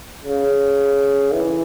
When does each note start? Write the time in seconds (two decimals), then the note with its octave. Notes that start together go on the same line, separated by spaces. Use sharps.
0.24 C#3
1.33 E3